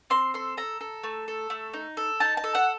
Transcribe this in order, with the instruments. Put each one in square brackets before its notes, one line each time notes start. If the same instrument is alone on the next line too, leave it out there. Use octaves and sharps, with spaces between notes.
[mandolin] C4 C6
A4 C6
A4 A#5
A4
A3
A4
A3
D#4
A4
D#4 A5
A5
A4
F#5